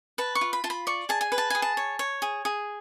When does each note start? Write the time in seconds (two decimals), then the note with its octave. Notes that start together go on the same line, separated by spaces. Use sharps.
0.18 B4 A5
0.35 C#6
0.41 F4
0.53 B5
0.64 F4 A5
0.70 B5
0.87 D5 C#6
1.09 G#4 A5
1.21 G#5
1.32 B4
1.38 A5
1.50 G#4 G#5
1.62 A5
1.77 C#5
1.99 C#5
2.22 G#4
2.45 G#4